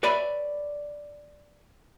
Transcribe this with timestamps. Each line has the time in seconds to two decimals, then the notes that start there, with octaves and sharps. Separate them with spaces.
0.03 B4 C#5 D5 E5 G#5 B5